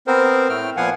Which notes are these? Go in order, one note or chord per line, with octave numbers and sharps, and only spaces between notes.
B3 C4 A#4 C5
A2 A3 G5 F6
A#2 F3 B3 F5 F#5 G#5